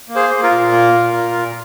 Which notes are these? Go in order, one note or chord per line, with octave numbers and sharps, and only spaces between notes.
A#3
G#4 C5
A#3
F4 A#4
A#2
A#3
A#2
A#2
A#2